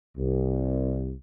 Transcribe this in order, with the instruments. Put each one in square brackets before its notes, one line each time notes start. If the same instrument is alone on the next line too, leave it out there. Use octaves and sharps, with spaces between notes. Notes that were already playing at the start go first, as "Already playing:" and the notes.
[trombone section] C2